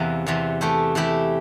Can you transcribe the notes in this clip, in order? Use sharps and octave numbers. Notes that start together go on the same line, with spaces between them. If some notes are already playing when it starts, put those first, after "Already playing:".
Already playing: E2 C3 E3 A#3 E4
E2 C3 E3
E3 A3 E4 G4
E3 A3 E4 G4